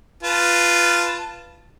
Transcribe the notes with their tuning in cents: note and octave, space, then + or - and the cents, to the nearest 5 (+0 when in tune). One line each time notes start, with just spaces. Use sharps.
F4 -10 B4 +0 A5 +0